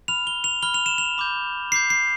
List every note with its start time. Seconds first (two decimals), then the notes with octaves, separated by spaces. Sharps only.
0.08 B5 F6 F7
0.27 G7
0.44 F7
0.62 B5 F6 G7
0.74 F7
0.86 E7
0.98 F7
1.18 B5 D6 G6
1.72 B5 D6 G6 C7
1.90 C7